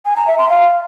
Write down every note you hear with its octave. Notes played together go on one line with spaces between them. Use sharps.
G#5
A#5
E5
C6
F5